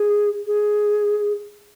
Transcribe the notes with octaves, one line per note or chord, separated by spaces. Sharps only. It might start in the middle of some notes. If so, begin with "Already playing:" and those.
Already playing: G#4
G#4